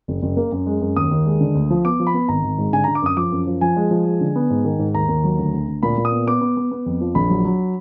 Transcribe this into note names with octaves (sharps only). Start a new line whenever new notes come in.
F#1
F#1
A#3
F#2
G#3
F#2
D#2 D#6
D#2
G#3
D3
D2
F3
B3 D6
F3
B5
B3
G#1 A#5
G#1
G#2
D3 G#5
D3 A#5
D6
F#2 D#6
F3 D6
F#2
F3
F3 G#5
G#3
F3
G#3
D3
B3
G#2
D#3
G#2
D#2 A#5
D#2
F#3
D2
D2
D2
A#2 B5
A#2
D#6
B3
B3 D6
B3
B3
B3
F2
F3
A#1 B5
F#3
F#3